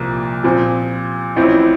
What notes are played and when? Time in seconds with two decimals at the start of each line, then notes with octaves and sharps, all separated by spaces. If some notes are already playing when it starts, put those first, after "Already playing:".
Already playing: C2 A#2 F3 A#3
0.44 A#2 F3 C4
1.36 A1 A2 F3 C4 E4